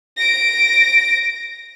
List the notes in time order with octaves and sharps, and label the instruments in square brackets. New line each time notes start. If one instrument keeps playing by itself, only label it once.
[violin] A#6 D7